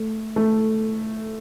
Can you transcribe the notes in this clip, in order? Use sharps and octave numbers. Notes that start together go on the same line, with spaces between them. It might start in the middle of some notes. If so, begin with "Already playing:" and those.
Already playing: A3
A3